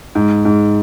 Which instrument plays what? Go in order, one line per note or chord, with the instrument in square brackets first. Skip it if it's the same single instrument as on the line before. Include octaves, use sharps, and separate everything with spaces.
[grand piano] G#2
G#2